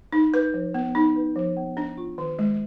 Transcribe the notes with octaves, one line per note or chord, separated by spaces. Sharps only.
D#4
B4
F3
B3
D#4
B4
F3
B3
D4
F4
D#3
G#3